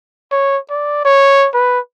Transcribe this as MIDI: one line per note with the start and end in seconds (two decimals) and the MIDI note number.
0.32 0.58 73
0.70 1.04 74
1.05 1.48 73
1.54 1.79 71